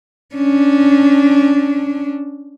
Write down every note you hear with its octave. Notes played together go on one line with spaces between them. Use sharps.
C#4 D4